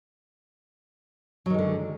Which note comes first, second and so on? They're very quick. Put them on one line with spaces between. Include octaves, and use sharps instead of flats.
F#3 D#3 G#3 D3